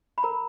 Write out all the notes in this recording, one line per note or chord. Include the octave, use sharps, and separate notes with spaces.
B5
A#4 A#5